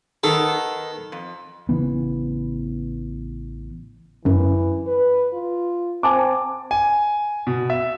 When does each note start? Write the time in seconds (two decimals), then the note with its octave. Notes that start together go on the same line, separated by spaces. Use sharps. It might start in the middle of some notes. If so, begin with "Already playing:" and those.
0.24 D#3 B3 A4
1.12 F2
1.69 A1 C#3 E3 B3
4.25 G1 F#2 E3
4.87 B4
5.33 F4
6.03 C4 G#5 A5 D6
6.71 G#5
7.47 B2
7.70 E5